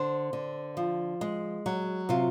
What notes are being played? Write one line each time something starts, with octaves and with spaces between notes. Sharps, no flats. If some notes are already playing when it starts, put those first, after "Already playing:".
Already playing: D3 C5
D3
F3
G#3
F#3
C3 F4